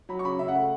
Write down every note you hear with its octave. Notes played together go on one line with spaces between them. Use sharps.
F#3 B5
C#6
C#3 B5
C#3 E5
F#5
A3